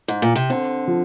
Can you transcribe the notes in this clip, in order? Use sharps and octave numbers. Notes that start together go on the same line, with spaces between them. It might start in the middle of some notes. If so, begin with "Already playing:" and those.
G#2
A#2
C3
D3 C4
F3